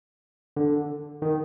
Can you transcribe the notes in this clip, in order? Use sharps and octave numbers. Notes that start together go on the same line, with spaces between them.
D3
D#3